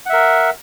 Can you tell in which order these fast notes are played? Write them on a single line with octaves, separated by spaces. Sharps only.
F#5 E5 A#4